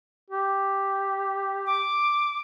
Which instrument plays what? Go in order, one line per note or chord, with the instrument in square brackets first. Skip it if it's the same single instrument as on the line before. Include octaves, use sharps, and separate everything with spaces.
[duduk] G4
[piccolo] D6